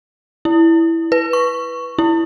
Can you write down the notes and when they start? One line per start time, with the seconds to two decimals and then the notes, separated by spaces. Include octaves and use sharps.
0.45 E4
1.12 B4
1.33 C#6
1.99 E4